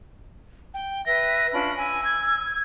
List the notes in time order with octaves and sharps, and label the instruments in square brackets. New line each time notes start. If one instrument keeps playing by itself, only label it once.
[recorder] G5
[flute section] B4 E5 [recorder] A#6
[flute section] C#4 D4 F4 [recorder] B5
[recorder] G#5 [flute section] E6
[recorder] G#6